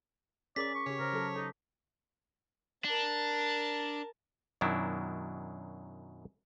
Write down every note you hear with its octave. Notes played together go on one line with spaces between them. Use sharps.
C#4 G#4 A#4 D5 D6 B6
C#6
C#3 G4 C#5
C#3 A#4 C5
F#3 A4
D#4 A4
D4 A#4 A5
F#2 B2 D#3 F#3 D4 E4